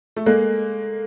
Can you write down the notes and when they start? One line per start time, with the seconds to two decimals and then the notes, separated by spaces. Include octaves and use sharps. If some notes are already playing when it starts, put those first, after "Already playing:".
0.16 A3
0.26 G#3 A#3 A4